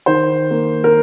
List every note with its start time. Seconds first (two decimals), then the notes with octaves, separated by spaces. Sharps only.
0.06 D#3 C5
0.51 A#3
0.84 A#4